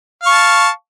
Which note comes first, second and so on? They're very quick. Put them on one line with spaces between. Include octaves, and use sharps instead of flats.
F5 C#6 A5